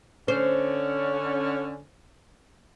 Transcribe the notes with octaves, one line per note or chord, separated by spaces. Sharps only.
D3 C#4 C5